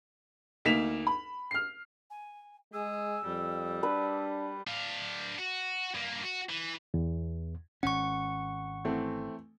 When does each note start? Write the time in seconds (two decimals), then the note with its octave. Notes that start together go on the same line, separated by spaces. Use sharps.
0.65 D2 A#3 D#4 B6 E7 F7
1.07 B5
1.51 F6 C7
2.10 G#5
2.73 G#3 G#4 E6
3.25 F2 G3
3.83 D4 B4
4.67 D4 F5
5.38 F#4
5.94 G2 A#3
6.22 F#4
6.49 E3
6.94 E2
7.83 G#1 C#4 F#5 C#6
8.85 E3 A3 C4